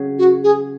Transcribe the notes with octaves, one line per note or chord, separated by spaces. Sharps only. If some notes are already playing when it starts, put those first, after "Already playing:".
Already playing: C#3 F#3
F#4
G#4